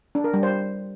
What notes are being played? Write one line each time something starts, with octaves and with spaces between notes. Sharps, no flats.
D4
A#4
G3
C5